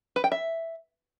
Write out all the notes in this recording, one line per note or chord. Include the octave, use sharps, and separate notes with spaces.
B4
G5
E5